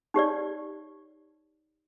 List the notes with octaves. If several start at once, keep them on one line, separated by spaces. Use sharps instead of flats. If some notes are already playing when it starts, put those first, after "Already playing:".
D#4 G4 C#5 D5